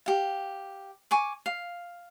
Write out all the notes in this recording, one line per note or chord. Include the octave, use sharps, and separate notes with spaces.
G4 F5
G#5 C#6 D6
F5